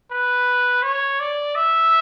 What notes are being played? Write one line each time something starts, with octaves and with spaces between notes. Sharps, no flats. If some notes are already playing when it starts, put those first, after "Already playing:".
B4
C#5
D5
E5